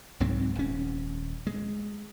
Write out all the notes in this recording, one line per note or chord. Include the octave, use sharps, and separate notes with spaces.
C2 G#2 F#3 C4
D#1 C#4
G#3